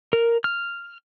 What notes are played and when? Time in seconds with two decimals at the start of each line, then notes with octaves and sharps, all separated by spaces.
0.13 A#4
0.44 F6